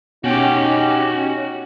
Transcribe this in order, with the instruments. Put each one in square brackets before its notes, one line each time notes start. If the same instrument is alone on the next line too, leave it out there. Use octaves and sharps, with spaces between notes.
[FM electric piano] B2 [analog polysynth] C#4 G4 [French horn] D#4 [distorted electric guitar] F#4 G5